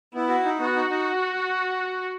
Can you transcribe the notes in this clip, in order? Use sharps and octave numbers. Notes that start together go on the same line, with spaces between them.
B3 E4
F#4
D#4
B3 F#4
D#4
D#4